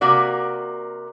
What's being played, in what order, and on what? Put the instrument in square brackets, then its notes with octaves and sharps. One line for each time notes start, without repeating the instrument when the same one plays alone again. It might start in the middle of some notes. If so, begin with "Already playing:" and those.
[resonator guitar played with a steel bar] C3 A#3 F#4 D5